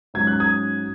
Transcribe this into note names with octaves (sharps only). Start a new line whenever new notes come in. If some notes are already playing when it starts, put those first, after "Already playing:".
G#2 F#3 C#4 G#6
F#6
D#6 G#6